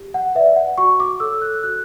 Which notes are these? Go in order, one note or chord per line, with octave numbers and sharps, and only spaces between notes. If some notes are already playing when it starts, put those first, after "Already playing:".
Already playing: G4
F#5
B4 D5 E5
F#5
F#4 C#6
D6
A4 C#5 E6
F#6
F#4 F#6